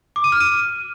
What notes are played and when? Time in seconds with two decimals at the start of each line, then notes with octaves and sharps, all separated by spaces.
0.16 D6
0.24 D#7
0.32 F6
0.40 D#7